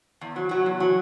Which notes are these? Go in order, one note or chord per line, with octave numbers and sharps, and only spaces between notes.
E2
F#3
F#3
E2
F#3